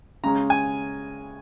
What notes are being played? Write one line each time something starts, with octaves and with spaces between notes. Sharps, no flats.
C#3 G#3 C#4 A#5
G#5